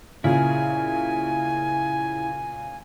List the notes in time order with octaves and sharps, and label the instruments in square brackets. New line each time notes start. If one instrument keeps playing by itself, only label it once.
[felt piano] A#2 C#3 [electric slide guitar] E4 G#4 [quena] G#5